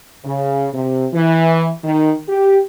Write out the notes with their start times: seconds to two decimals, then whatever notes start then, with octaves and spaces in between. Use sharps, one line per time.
0.24 C#3
0.72 C3
1.12 E3
1.83 D#3
2.28 G4